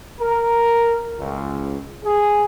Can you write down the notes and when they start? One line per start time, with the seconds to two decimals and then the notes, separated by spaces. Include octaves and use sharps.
0.20 A#4
1.16 C#2
2.04 G#4